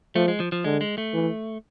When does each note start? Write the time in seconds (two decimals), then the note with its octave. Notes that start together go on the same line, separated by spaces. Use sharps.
0.15 F3 A3
0.28 G#3
0.40 F3
0.52 F3
0.64 D3 G#3
0.81 G#3
0.98 A3
1.14 E3